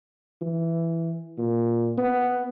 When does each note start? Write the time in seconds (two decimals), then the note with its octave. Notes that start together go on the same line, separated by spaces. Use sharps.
0.41 E3
1.38 A#2
1.98 B3